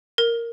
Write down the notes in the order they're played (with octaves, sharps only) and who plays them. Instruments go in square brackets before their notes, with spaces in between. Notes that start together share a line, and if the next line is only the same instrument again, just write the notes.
[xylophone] A#4